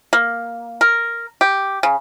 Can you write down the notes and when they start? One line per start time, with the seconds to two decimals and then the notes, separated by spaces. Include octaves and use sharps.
0.13 A#3
0.81 A#4
1.41 G4
1.83 C#3